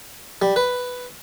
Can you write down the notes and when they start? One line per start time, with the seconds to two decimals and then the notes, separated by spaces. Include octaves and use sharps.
0.42 G3
0.56 B4